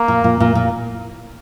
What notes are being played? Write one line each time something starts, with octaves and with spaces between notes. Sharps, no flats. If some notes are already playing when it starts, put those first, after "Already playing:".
Already playing: A#3
A#2
A#2
A#2
A#2